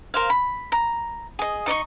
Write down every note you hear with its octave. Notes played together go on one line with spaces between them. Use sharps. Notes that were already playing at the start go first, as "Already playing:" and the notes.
A#4 C5 F5
B5
A#5
G#4 D#5
D#4 D5 D#5 C#6